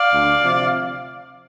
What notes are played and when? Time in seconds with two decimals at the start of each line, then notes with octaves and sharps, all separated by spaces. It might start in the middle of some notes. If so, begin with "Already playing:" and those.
Already playing: D5 F5
0.13 D2
0.43 C3 F3